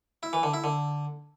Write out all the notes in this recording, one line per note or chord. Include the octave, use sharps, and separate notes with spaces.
E4
E3
D3
E4
D3